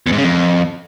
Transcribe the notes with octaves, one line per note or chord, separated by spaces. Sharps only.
E2
G#2
C#3
F2